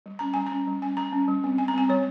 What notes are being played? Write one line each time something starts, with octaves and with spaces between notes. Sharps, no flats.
G3
C#4 A#5
G3 G#5
A#5
C#4
G3
C#4 G#5
G3 A#5
C#4
G3
C4
G3 G#5
A#5
C4 G#5
G3 C#5